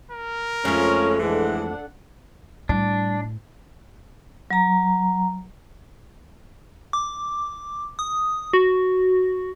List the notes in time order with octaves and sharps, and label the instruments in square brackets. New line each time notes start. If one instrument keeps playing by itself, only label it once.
[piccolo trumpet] A#4
[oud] F2 A3 [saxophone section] G#3 C#4 [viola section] F4
[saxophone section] E3 G#3 [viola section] D4 A4 F#5
[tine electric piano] A2 [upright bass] G3 [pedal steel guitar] D4
[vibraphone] F#3 A#5
[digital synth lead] D6
D#6
F#4